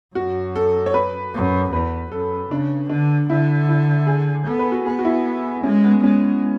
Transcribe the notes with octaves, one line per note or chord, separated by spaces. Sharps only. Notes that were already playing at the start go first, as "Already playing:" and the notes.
F#2 F#4
A4
C#5
B4
F#2
E2 B4
F#2 A4
C#3 D4
D3 D4
D3 E4
E4
G#4
B3 A4
B4
F#4
B3 G#4
F#4
E4
G#3 C#4
B3
G#3 C#4